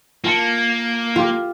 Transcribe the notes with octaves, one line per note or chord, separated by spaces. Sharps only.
A#3 F4 A5 C#7
F4 G4